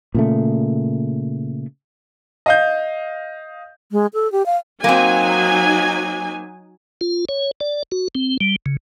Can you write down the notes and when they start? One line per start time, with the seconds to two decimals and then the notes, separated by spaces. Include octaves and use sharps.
0.15 A#2 C#3 A3
2.46 D#5 F5 G6
3.92 G#3
4.14 A4
4.32 G4
4.46 F5
4.84 F#3 A#3 C4 D#4 G#5
7.01 F4
7.29 C#5
7.60 D5
7.92 F#4
8.15 C4
8.41 G3
8.66 C#3